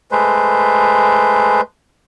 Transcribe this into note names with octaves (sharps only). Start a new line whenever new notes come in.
G#3 A3 B4 C5